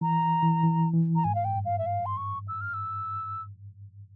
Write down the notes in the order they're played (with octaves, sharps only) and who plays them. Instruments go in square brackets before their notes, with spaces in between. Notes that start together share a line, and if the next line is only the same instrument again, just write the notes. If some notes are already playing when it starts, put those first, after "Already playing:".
[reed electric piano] E3 [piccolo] A#5
[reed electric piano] E3
E3
E3
[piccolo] A#5
[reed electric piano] G#2 [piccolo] G#5
[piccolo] F5
G5
[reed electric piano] G2
[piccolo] F5
E5
F5
C6
C#6
E6
F6
E6